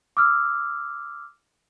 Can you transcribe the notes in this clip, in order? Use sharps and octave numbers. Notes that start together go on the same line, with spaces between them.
D6 E6 F6